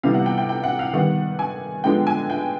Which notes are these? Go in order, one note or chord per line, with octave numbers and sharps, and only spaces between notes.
C3 E3 G3 B3 F5
F#5
G5
G5
G5
F#5
F5
D#3 G3 B3 F#5
G#5
D3 F3 G#3 B3 G5
G#5
G5